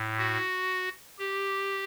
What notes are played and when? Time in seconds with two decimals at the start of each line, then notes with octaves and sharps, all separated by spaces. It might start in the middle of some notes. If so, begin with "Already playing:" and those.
Already playing: A2
0.18 F#4
1.19 G4